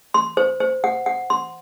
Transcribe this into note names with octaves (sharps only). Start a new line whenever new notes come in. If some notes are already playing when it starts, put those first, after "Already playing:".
C6
C5
C5
F#5
F#5
C6